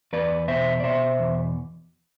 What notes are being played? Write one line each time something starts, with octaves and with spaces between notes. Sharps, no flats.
E2 B4 D5
B2 C5 E5
D5
B2 C5 E5
E2